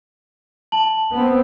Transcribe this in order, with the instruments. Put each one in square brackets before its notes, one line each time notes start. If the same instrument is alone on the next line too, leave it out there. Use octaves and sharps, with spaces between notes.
[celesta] A5 F#7
[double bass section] B3 C4